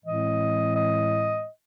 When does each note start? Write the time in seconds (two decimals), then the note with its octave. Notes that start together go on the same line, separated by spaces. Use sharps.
0.03 A2 E3 G#3 C4 D#5
0.74 D#5